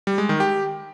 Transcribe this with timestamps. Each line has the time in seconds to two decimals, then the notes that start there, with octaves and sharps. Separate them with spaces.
0.07 G3
0.18 G#3
0.29 D#3
0.40 G4